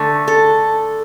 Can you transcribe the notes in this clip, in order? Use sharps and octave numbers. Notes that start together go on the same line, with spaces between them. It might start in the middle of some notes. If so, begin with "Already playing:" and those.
Already playing: D3 A3
A4